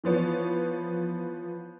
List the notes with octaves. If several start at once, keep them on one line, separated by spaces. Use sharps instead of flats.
E3 F3 B3 C#5